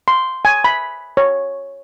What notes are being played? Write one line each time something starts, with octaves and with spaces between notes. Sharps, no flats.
C6
G#5
B5
C#5